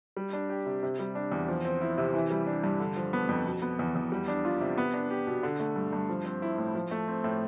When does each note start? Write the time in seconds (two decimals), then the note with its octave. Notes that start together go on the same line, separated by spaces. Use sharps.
0.17 G3
0.33 D4
0.50 G4
0.66 C3
0.83 C3
0.99 G3
1.15 D4
1.32 E2
1.48 F3
1.65 C4
1.81 E4
1.98 C3
2.14 E3
2.31 G3
2.47 D4
2.64 G2
2.80 D3
2.96 F3
3.13 B3
3.29 F2
3.46 B2
3.62 B3
3.79 E2
3.95 E2
4.12 G3
4.28 D4
4.45 F4
4.61 C3
4.78 B3
4.94 D4
5.10 G4
5.27 B2
5.43 D3
5.60 A3
5.76 G2
5.93 G2
6.09 F3
6.26 C4
6.42 E4
6.58 A2
6.75 F3
6.91 A3
7.08 C4
7.24 A2